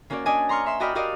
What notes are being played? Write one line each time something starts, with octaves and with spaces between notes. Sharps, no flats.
A#3 C#4 F#4 A#4 D5
C#4 D4 D5 D#5 G#5
A#5 C6 C#6 F6
E5 C6 E6
F#4 D5 D#5 G5 B5 F6
F#4 G4 A#4 D5 D#5 F5